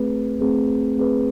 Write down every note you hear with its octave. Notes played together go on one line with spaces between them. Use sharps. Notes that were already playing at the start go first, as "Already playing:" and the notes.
Already playing: A3 C4 G#4 B4
A3 C4 G#4 B4
A3 C4 G#4 B4